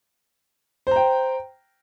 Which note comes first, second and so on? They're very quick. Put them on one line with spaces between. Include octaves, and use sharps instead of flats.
C5 A#5 G5